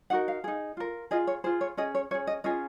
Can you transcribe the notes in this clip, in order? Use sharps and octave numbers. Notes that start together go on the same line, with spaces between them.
D#4 F#4 A#4 F#5
F5
D#4 G#4
F4 A#4
F4 G#4 D#5
C#5
F4 G#4 C5
C#5
C#4 G#4 D#5
C#5
C#4 G#4 C#5
D#5
C#4 F4 G#4 D#5